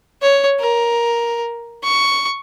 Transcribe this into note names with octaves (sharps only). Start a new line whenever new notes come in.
C#5
A#4
C#6